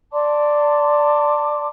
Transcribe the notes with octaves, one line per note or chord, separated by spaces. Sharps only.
D5 A5 C6 D6